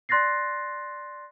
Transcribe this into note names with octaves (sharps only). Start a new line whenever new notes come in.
D5 C6 F#6 A6 A#6 C7